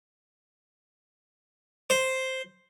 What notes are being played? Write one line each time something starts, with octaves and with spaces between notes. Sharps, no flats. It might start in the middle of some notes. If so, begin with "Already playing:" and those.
C5